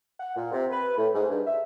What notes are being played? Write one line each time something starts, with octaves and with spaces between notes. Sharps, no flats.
F#5
A#2
C3
B4
A2
G#2
G2
E5